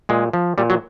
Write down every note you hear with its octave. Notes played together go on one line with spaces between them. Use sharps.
A#2 G#3
F3
A#2 G3
F#3